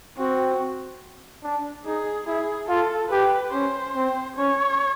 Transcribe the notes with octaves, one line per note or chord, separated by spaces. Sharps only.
C4 F#4
D4
D#4 G#4
E4 G#4
F4 A4
G4 B4
C#4 C5
C4
C#4 C#5